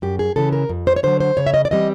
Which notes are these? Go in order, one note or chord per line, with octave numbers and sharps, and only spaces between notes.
F#2 G4
G#4
C#3 E3 A4
A#4
F2
C5
C#5
D3 F#3 C5
C5
C#3 C#5
E5
D#5
D5
E3 G3 C4 D#5